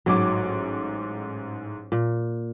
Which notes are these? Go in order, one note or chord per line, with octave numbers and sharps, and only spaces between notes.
A1 G#2 F#3 D6
A#2